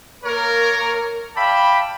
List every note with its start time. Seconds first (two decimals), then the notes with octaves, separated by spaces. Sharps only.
0.24 A#3 A#4 C#5
1.35 D5 E5 F5 G5 A5 B5